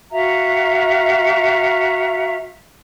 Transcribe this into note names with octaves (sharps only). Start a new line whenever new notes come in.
F#4 E5 F5 A#5